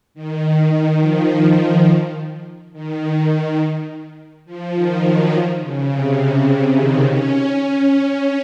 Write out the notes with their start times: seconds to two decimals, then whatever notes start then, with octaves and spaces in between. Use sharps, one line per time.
0.14 D#3
1.00 F3
1.43 D#3
2.73 D#3
4.45 F3
4.74 D#3
5.03 F#3
5.31 F3
5.60 C#3
5.89 C3
6.18 C#3
6.47 C#3
6.75 D#3
7.04 C#4
7.47 C#4